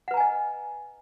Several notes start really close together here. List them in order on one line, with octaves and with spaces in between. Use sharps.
F#5 B4 A#5 G#5 D#5